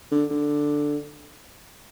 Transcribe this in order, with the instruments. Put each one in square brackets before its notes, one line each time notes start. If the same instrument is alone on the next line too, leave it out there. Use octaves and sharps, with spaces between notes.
[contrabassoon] D3
D3